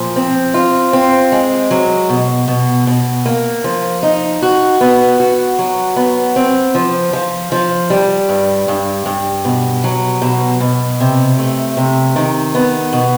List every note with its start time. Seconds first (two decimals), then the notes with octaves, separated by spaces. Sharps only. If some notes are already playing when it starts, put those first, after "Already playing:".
Already playing: A#2 F3
0.16 C4
0.54 F4
0.93 C4
1.32 G#3
1.71 F#3
2.09 B2
2.48 B2
2.87 B2
3.26 A#3
3.64 F3
4.03 D#4
4.42 F#4
4.81 B3
5.20 F#4
5.59 F#3
5.96 B3
6.36 C4
6.75 F3
7.13 F3
7.52 F3
7.90 G3
8.29 G2
8.68 G2
9.06 G2
9.45 B2
9.84 F#3
10.22 B2
10.60 B2
11.00 C3
11.38 A3
11.77 C3
12.16 D#3
12.55 B3
12.93 B2